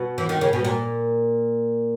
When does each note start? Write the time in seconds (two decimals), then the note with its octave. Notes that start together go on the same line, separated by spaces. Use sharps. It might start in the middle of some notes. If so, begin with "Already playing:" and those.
Already playing: B2
0.18 E3
0.29 D#3
0.41 C#3
0.53 B2
0.64 A#2